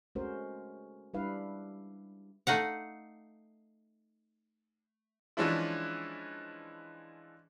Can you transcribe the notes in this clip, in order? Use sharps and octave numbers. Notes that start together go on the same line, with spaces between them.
G#3 A3 C#4 F#4 A#4 C5
G3 D4 E4 B4 F5
A3 D#4 F5 F#5
E3 F3 G#3 C#4 D4 E4